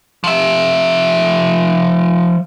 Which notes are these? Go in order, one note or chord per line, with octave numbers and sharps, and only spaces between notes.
F3 E5